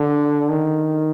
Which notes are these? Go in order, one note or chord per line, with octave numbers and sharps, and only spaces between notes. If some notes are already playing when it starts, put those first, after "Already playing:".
Already playing: D3
D#3